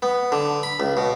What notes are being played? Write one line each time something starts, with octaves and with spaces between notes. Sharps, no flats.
B3
D3
B5
C#2
B2